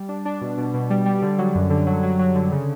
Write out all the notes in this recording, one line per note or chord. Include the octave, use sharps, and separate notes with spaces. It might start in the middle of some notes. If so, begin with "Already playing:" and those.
Already playing: G3
D4
D4
B2
B2
B2
G3
G3
D3
F#3
F#2
D3
F#3
F#3
F#3
D3
C#3